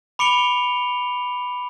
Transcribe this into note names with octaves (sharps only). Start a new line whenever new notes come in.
B5 D6 C#7 D7 F7 G7